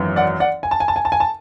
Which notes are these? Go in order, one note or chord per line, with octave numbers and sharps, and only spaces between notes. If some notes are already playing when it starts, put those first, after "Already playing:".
Already playing: G#1 F#2 E3
D5 F#5
D5 F#5
G#5
A5
G#5
A5
G#5
A5
G#5
A5